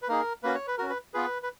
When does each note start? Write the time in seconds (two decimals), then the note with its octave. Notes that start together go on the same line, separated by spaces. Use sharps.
0.02 B4
0.09 A#3 D#4 G#4 A#4
0.43 A#3 C#4 F#4 B4
0.55 C#5
0.67 B4
0.78 C#4 F#4 A#4
0.90 B4
1.14 B3 F4 G#4 B4
1.43 B4